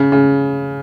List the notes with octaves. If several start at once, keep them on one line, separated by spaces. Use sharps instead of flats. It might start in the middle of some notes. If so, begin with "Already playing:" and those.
Already playing: C#3
C#3